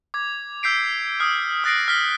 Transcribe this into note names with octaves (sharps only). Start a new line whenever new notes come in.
D6 G#6
E6 G6 B6 C7 D7
D#6 F6 C7
D#6 F#6 A6 A#6 C7 D7
F6 B6 G7